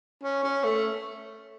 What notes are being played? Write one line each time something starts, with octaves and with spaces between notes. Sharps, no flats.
C#4
C#4
A3